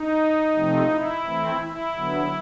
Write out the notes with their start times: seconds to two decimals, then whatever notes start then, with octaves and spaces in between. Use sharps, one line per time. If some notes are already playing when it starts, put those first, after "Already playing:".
Already playing: D#4
0.56 C3 F3 A3 C4
0.90 E4
1.26 E3 A3 C4
1.61 E4
1.96 D3 F#3 B3